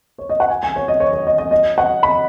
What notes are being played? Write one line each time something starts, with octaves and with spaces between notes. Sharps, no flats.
C#5
D#5
F#5
G#5
G#5
C#5
D#5
C#5
C#5
D#5
D#5
D#5
F#5
B5